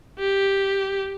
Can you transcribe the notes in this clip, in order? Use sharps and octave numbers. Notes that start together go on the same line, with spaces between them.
G4